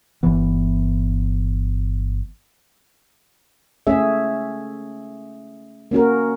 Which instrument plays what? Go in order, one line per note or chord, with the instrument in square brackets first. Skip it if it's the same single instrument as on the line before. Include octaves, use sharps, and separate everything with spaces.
[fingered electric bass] G1 E3 B3
[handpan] A3 C#4 G#4 E5
A#3 C#4 F#4 A#4